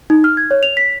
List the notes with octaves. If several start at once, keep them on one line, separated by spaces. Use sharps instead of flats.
D#4
F6
G#6
C#5
F7
B6